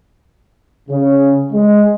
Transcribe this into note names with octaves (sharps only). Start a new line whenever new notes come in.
C#3
G#3